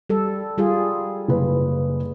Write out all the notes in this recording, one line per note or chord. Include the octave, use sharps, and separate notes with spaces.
G3 A4
G3 F4 G#4
F#1 B4